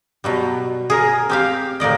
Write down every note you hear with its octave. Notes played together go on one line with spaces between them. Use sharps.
B2 F#3 G3
G#4 A#4
C4 G4 F5
A2 A#3 D5 D#5